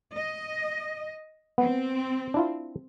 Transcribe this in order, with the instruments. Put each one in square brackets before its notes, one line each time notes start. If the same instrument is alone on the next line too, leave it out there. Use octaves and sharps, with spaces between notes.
[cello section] D#5
[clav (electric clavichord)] B3 [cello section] C4
[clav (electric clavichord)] D4 E4 F4